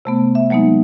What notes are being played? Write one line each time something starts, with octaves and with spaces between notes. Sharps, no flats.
C3 A3 B3
E5
F#3 G#3 A#3 B3 D#4